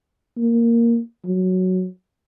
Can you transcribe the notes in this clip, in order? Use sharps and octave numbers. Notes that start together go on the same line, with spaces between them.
A#3
F#3